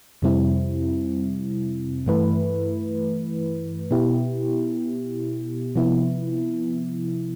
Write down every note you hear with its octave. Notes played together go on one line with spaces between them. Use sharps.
F2 C3 G3 C4 E4
G2 E3 A3 E4 B4
B2 B3 E4 G4
C3 F3 B3 E4